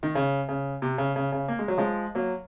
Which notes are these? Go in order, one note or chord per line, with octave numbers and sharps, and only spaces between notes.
D#3
C#3
C#3
C3
C#3
C#3
C#3
A#3
G#3
F#3
F3 G#3
F#3 A#3